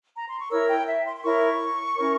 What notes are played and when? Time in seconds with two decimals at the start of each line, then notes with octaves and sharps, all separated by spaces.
0.15 A#5
0.27 C6
0.38 C#6
0.50 E4 A#4 C#5 E6
0.69 G5
0.87 E5
1.05 C6
1.16 C6
1.23 E4 A#4 C#5 C#6
1.96 C#4 E4 A#4 C#5